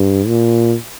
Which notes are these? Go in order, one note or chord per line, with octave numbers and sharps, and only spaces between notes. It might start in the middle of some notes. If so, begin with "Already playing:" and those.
Already playing: G2
A#2